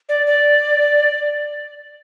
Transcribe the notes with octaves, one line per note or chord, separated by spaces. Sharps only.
D5
D5